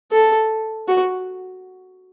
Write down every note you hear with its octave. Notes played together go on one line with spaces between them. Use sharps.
A4
F#4